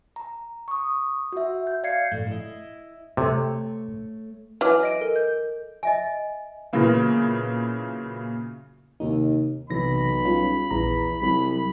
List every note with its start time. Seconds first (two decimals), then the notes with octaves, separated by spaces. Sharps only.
0.16 A#5
0.68 C#6 D#6
1.32 F#4 E5
1.67 G6
1.83 D5 F5 G#6 C7 C#7
2.11 A2
2.27 E4 D#5
3.17 C3 A3 C#5
4.61 E3 F#3 G#5 D6 F6
4.83 D#5 D7 D#7
5.01 A4 A#4
5.16 G6
5.83 D#5 E5 G#5
6.73 A#2 C#3 E3 F#3 A#3 B3
9.00 D#2 C3 D#4
9.70 B1 C3 E3 B5 A#6
10.25 G3 C#4 F4
10.71 A#1 E2 A#5
11.22 C2 F#3 B5